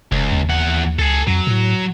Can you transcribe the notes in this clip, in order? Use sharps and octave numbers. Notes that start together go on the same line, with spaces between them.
F1 C#2
D#2
E2 F#5
C#2 G#4 A4
F2 F#3
A2